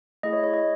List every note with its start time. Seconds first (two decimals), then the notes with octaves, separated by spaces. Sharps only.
0.23 A3 E4 G#4 D#5
0.33 C#5
0.43 C#5
0.53 D#5